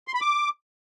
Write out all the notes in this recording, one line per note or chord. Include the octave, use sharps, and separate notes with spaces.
C6
B5
D6